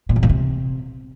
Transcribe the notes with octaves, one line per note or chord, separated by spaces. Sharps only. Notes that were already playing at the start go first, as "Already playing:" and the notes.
A#2
E2
A#2
C3